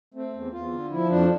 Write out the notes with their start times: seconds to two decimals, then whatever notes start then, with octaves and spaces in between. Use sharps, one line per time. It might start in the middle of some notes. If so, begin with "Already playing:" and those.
0.14 A3 C4
0.33 E2
0.52 E2 F4
0.71 D3
0.91 F3 E4
1.09 F2 D4